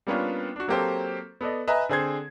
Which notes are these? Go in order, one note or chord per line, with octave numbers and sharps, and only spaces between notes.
G3 A#3 B3 C#4 D4 F4
D4 F#4
F#3 A#3 C4 G4 A4 C5
B3 A4 D5 D#5
B4 D#5 E5 G#5 A#5
D3 C4 G#4 C5 C6 G#6